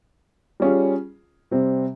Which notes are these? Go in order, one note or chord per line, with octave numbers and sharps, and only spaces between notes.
G3 C#4 F4 G#4
C3 G3 C4